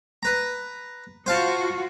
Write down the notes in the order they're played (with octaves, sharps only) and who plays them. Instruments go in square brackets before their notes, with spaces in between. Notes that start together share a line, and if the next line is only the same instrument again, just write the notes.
[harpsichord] B4 A#5
[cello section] F4 F#4 [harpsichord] C5 F5 A5